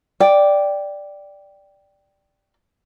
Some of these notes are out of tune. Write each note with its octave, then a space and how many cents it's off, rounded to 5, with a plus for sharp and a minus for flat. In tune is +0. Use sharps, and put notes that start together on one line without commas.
D5 +0 G5 +0